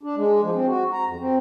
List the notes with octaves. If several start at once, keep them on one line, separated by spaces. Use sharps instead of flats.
D4
G#3
F3
C4
F#4
A#5
F2
C4